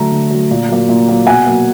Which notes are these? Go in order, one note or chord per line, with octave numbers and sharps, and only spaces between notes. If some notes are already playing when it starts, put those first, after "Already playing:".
Already playing: D3 F#3 A3 A#5
D3
F#3 A3
A#2
F#3 A#3
A#2
F#3 A#3
B2 F#5 G#5
F#3 A#3